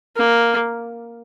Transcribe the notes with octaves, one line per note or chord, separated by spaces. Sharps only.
A#3